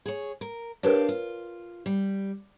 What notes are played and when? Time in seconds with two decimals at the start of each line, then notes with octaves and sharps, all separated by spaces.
0.06 G#4 C#5
0.41 A#4
0.83 D4 G4 A#4 B4 C#5 F5
1.09 F4
1.86 G3